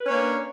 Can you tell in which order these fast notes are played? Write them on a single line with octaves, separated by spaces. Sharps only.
B4 C#4 C#5 A#3 D4